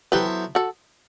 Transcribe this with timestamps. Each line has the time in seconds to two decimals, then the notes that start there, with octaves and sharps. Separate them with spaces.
0.12 F#3 B3 E4 G4 A4 B4 C5
0.55 F#4 A4